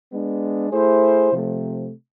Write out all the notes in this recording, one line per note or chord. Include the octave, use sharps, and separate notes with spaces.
G#3 B3 D4
A3 E4 G#4 C5
C3 F3 A3